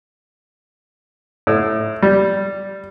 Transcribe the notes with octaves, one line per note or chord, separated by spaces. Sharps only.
A2
G3